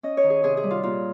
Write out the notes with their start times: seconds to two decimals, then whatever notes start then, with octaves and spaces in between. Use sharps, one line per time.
0.03 C#4 D#5
0.17 C#5
0.23 D#3
0.30 G#4
0.43 C3 G#4
0.57 G#4
0.63 G3
0.71 F4
0.83 A#2 F4